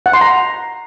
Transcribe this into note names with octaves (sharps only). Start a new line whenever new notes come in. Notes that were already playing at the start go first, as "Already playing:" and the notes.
F#5
C6
A#5